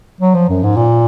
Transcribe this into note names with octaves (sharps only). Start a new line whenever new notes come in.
F#3
F3
F#2
G#2
A#2